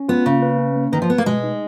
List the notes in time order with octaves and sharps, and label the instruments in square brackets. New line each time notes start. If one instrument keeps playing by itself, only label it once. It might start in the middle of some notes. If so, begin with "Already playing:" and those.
Already playing: [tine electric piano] C#4
[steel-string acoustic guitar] B3 [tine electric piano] F4
[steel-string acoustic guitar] C#3 [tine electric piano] A#3
[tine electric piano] B4
C#4
A#3
[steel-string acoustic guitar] D#3 [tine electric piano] B4
[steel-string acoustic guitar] F3
[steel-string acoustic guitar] B3 [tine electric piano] B4
[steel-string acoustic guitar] A#3
[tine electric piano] B2 [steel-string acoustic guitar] G#3
[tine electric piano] D#4